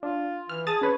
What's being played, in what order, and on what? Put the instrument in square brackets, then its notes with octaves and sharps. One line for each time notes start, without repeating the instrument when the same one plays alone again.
[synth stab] D4 [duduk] F4
[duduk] E3 [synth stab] F6
[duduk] G#4 [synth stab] A5 D#6 A6
[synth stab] C#4 B4 C#5